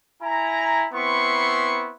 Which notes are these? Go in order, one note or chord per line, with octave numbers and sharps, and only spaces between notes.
E4 G#5 A#5
B3 C4 E4 C6 C#6